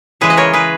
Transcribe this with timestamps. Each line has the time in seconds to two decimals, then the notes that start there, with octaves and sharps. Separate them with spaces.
0.21 C#3 E3 G#3 G#4 B4
0.30 D#5
0.37 A#4 C#5
0.53 G#4 B4